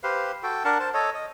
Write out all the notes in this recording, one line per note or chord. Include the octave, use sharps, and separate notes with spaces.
G4 B4 C5 F5
F#4 A4 G5
D4 A#4 F#5 A5
C5 A5
A4 C#5 D#5
D#5